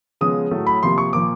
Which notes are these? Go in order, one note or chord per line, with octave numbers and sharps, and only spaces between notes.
C#3 F3 G#3 B3 D#6
A2 F#3 A3
B5
C3 F3 A#3 C6
C#6
A#2 F3 A#3 D6